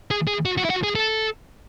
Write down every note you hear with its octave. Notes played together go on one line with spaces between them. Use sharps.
G#4
G#4
F#4
F#4
E4
F#4
G#4
A4